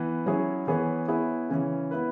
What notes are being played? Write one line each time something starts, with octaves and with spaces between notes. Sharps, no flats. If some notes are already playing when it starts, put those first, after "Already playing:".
Already playing: E3 B3
F#3 C#4 E4 G#4 C#5
E3 B3 G#4 C#5
B3 E4 G#4 C#5
C#3 E3 C#4
B3 E4 B4